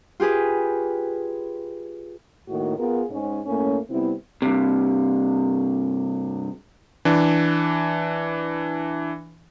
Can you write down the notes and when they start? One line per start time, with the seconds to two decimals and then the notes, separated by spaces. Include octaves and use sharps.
0.20 F4 G4 G#4 B4
2.48 A2 D#3 A#3 F#4
2.78 B3 F4 G#4 A#4
3.10 G#2 C#4
3.46 A2 A3 A#3 C#4
3.90 C3 G3 B3 C4 E4
4.42 G2 C3
7.05 E3 D4